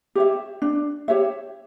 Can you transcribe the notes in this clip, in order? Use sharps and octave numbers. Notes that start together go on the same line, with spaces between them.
G4 C#5 E5
D4
G4 C#5 E5